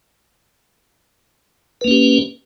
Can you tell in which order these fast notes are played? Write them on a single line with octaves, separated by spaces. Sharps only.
B4 A#3 C#4 G4